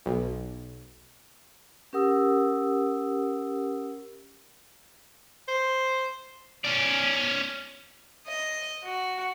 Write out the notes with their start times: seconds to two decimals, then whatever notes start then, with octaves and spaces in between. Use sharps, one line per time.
0.06 B1
1.93 C#4 G4 A#4 F#5 D#6 E6
5.48 C5
6.64 C#4 D5
8.26 D#5
8.84 F#4